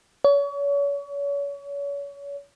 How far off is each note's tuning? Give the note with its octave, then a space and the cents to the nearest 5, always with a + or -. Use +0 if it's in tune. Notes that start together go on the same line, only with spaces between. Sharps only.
C#5 +35